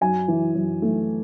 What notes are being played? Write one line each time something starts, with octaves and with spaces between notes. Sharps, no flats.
F#2 G#5
E3
F#2
A3